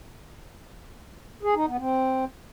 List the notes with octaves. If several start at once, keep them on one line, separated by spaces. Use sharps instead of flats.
G#4
D#4
B3
C4